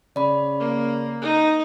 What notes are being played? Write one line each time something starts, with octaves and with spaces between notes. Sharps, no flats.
C#3 D5 B5
A#3
D#4